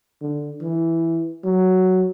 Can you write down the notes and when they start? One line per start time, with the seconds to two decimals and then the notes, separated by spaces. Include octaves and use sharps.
0.22 D3
0.62 E3
1.44 F#3